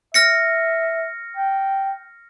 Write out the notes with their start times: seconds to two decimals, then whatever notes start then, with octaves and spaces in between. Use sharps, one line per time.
0.14 E5 F6 A#6 C#7
1.37 G5